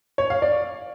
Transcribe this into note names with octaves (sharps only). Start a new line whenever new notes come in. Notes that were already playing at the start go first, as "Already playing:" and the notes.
C#5
F5
D5